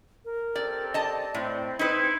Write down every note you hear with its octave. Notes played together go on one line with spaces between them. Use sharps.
A#4
C4 G4 A4 D5
D5 D#5 A5
A2 C4
C4 D#4 E4 B4 C5